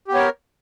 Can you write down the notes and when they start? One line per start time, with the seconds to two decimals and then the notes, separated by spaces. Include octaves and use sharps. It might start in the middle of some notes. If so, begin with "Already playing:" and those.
0.08 G4
0.11 B3
0.15 C#5
0.18 A#4